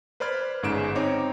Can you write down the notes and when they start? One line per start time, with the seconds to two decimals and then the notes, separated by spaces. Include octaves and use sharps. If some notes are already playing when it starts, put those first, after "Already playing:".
0.20 B4 C5 D5 B5 F6 G#6
0.63 G1 G#2 C#3 D7 E7
0.95 C4 D#4 C#5 D6